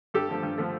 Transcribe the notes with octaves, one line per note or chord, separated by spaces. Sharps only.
G2 G4 A4
D3 F3 A3
G2
D3 F3 A3